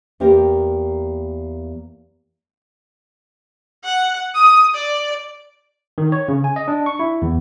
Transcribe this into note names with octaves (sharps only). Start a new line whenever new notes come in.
E2 A#3 G4 A#4
F#5
D#6
D5
D#3
C#5
C#3
G#5
D#5
D4
C#6
E4
E2